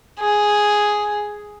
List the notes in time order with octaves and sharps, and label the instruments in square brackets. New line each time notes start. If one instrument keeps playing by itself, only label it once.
[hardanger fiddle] G#4